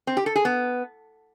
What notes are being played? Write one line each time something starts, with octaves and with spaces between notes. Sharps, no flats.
C4
G4
A4
G#4
B3